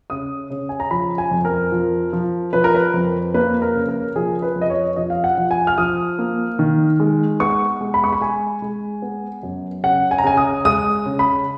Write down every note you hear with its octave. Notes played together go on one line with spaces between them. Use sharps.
C#3 D#6
C#3
G#5
A#5
F3 B5
G#5
F2
A#4
F3
F3
F3 B4
A#4
B4
F2
A#3 B4
A#4
C#3
A#4
F3 G#4
B4
F2
D#5
C#5
F3 D#5
F5
F#5
F3
G#5
F6
F3 D#6
A#3
D#3
G#3
B3 C#6
G#3
B5
C#6
B5
G#3 G#5
G#3
B3
F#2
C#3 F#5
G#5
A#5
C#3 G#5
D#6
G#3 D#6
C#3
B5